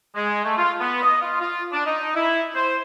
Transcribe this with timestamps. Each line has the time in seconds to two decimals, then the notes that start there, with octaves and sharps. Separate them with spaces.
0.15 G#3
0.44 A3
0.57 F4
0.80 B3
1.03 D#5
1.21 F4
1.41 F4
1.72 D4
1.86 D#4
2.15 E4
2.55 C5